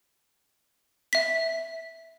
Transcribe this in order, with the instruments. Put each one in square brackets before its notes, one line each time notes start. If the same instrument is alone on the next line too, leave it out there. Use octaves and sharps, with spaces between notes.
[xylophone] E5 B6